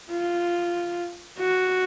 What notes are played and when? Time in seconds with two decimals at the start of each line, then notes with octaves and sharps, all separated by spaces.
0.11 F4
1.39 F#4